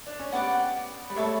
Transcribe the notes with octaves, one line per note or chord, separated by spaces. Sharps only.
D4
C#4
B3 G4 D5 F#5
G3
A3 C#5 E5 A5 C#6